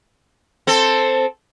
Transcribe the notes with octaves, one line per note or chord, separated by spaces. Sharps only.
C4 A4